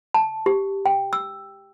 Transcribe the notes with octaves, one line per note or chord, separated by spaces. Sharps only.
A5
G4
G5
E6